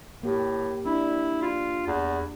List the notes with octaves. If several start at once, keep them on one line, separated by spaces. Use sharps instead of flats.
A2 A#3 G4
D4 E4
F4
E2